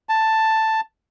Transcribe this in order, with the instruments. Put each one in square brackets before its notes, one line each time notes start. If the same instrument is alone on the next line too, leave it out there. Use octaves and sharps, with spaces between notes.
[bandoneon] A5